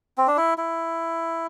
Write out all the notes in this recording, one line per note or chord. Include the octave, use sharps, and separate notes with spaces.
C4
D4
E4
E4